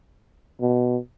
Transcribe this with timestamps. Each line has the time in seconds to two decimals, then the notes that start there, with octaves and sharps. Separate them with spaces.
0.61 B2